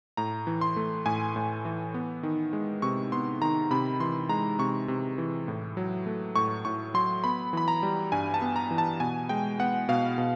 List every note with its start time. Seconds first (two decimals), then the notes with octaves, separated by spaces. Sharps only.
0.17 A2 A#5
0.47 E3
0.61 C6
0.76 A3
1.06 A2 G#5
1.36 A2
1.65 E3
1.94 B3
2.23 D#3
2.53 G#3
2.82 C3 C#6
3.12 B3 C6
3.42 D#3 A#5
3.71 C3 B5
4.00 E3 C6
4.29 G#3 A#5
4.59 C3 C#6
4.88 C3
5.18 E3
5.48 A2
5.77 F#3
6.06 A3
6.36 A2 C#6
6.65 A2 C#6
6.94 F#3 C6
7.24 B3 B5
7.53 E3 B5
7.68 A#5
7.83 G3
8.12 G2 G#5
8.34 A5
8.42 B3
8.56 A#5
8.71 E3
8.78 A5
9.00 B2 G#5
9.29 G#3 G5
9.59 B3 F#5
9.89 B2 F5
10.18 B2